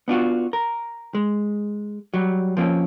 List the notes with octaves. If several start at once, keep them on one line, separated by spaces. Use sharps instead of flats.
B3 D4 F4 F#4
A#4
G#3
F#3 G3
F3 A#3 C4 C#4